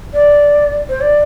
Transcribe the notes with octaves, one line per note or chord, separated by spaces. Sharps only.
D5
C5
D5